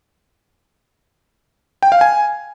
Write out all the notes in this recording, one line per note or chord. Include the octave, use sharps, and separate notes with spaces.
G5
F5
G#5